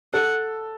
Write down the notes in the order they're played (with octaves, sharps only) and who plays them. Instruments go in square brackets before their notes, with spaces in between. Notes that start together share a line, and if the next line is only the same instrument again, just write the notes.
[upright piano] A4 [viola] F#5